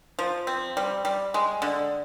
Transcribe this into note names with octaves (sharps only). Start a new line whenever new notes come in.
F3
C4
G3
G3
G#3
D3